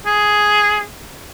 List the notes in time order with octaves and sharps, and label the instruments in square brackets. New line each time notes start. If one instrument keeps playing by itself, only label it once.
[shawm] G#4